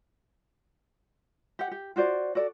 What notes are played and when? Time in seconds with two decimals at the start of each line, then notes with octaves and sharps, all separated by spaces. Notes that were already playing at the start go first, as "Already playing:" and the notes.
1.59 G4 F#5
1.71 G4
1.96 F4 F#4 C5 D5
2.35 F#4 A4 D5